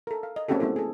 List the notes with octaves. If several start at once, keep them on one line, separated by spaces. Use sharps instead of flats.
A4 A#4
F5
D#5
A#3 C4 C#4 F#4 G4 A4
A3 B3 C4 E4 A4
G#4 A4